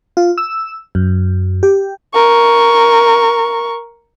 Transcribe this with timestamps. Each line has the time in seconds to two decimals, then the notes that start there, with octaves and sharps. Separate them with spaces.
0.17 F4
0.38 E6
0.95 F#2
1.63 G4
2.14 A#4 C#6